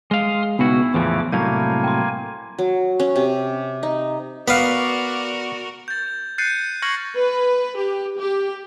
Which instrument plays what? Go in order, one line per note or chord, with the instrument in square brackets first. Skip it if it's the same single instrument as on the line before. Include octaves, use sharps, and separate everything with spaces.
[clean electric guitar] G#3 F5 [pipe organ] C6 D#6 F6
[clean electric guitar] C#2 B2 F#4 [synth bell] B3 [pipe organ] E4
[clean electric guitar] E2 A2 F3 [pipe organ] C#3 E3 D6
[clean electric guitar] C2 A2 F#3 [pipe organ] A#3 G#5 [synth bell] G6
[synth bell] G5 C6
[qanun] F#3
C#4
C3
D#4
[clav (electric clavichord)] B3 [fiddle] F#4 A#4 [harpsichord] B4 F5 [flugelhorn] D5
[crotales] G6 A6
F#6 G6 A6 C7 C#7 D#7
C#6 F6 G#6 A#6 C#7 F#7
[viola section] B4
G4
G4